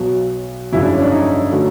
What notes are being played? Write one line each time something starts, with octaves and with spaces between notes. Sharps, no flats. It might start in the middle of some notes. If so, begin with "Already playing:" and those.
Already playing: B1 B2 F#3
G1 F2 C#3 F#3 E4
D4
C#4
D4
D#4
D3 F#3 A3